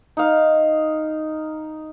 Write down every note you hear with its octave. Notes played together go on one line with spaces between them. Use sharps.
D#4 F5